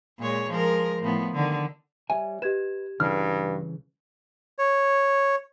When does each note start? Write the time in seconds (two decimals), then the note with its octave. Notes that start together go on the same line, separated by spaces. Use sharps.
0.19 A#2 G#3 C#5
0.49 F3 G#3 A#4
1.02 A2 F3 B3
1.34 D3 D#3
2.10 G3 C#5 E5 G#5
2.42 G4 B4 D#5 G#6 E7
3.00 C2 G2 C#3 E3 F6
4.58 C#5